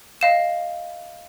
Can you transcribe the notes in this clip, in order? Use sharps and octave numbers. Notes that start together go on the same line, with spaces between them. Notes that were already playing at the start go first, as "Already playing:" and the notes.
D#5 F5 E7